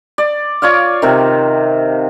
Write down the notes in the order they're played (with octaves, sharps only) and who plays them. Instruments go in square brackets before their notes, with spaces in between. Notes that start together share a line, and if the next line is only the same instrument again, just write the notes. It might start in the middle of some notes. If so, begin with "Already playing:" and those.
[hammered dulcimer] D5
F4 C#5 D5 F5
C3 D#3